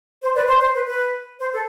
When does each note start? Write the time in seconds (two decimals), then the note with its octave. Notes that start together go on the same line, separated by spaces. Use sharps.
0.22 C5
0.35 B4 D5
0.48 C5
0.61 C5
0.75 B4
0.87 B4
1.40 C5
1.53 A4